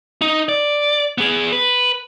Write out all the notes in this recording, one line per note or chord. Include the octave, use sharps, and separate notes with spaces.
D#4
D5
B3 G#4
B4